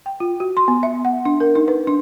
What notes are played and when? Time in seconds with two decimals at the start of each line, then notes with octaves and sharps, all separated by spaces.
0.06 G5
0.20 F4
0.40 F#4
0.57 C6
0.68 B3
0.83 E5
1.05 F#5
1.25 D4
1.40 A#4
1.55 D#4
1.68 B4
1.87 D4